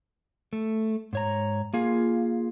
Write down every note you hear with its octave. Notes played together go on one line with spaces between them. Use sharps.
A3
G#2 C#5 A#5
A#3 F4 G#4 F5